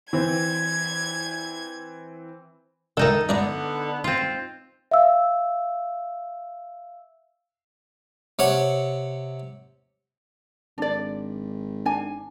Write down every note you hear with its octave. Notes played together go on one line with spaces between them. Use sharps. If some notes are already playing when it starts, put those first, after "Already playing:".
E3 C4 G#6
D3 D#3 D#4 A4
D3 B3 D4 D5 A#5
C4 F4
E5 F5 E6
C3 C#5 F#5
G#1 D4 D5
D4 G#5